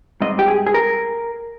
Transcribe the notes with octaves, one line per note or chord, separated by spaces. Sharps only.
G#2 G3 C4 D#5
G4
G#4
G#4
A#4